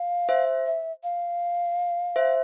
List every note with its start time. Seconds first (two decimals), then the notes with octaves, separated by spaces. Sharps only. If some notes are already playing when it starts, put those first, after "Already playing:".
Already playing: F5
0.29 C5 E5
0.66 E5
1.03 F5
2.16 C5 E5